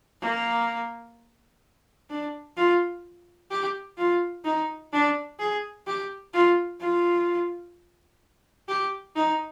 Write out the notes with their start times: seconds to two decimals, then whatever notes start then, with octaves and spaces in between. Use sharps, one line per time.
0.22 A#3
2.10 D4
2.57 F4
3.51 G4
3.98 F4
4.45 D#4
4.93 D4
5.39 G#4
5.87 G4
6.34 F4
6.81 F4
8.68 G4
9.16 D#4